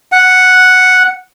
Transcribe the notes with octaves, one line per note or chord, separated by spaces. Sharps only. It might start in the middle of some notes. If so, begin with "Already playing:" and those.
F#5